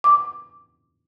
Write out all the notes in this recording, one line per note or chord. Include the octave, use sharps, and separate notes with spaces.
D6